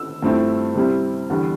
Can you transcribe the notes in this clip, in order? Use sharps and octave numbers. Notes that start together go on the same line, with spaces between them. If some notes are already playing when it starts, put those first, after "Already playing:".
Already playing: E6
G2 F3 A3 C4 E4
C3 G3 C4 E4
E2 D3 G3